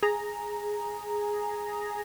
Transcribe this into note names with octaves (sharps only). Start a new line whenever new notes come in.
G#4 A#5